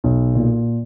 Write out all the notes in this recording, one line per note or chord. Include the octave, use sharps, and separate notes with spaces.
B1
A#2